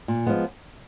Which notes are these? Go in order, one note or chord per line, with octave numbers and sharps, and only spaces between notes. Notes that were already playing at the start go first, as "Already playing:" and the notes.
A#2
F3 G#3 B3